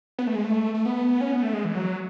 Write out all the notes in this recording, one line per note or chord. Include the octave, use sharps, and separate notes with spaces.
B3
A3
G#3
A3
A3
B3
C#4
B3
A3
G#3
E3
F#3